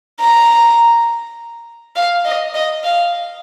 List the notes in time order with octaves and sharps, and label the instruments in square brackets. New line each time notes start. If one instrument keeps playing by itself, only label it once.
[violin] A#5
F5
D#5
D#5
F5